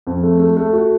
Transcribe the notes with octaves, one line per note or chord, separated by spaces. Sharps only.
F2
A3
A3
A3
F#4